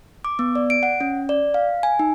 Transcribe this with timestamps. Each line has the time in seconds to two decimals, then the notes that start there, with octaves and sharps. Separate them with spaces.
0.25 D6
0.39 B3
0.55 D5
0.70 D7
0.83 F#5
1.00 C#4
1.29 D5
1.54 F5
1.83 G#5
1.99 D#4